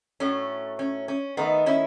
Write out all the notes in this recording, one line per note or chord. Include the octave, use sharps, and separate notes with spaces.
A2 F#3 A3 C#4
C#4
C#4
D#3 A3 B3 D#4
C#4 E4